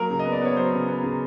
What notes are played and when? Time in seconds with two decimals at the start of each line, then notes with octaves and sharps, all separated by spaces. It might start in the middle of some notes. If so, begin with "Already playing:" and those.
Already playing: F#3 A#3 A#4
0.10 C#3
0.19 D#5
0.25 B3
0.32 D5
0.42 B3 C#5
0.57 F#3 C5
0.73 C#3
0.89 B3
1.03 C#3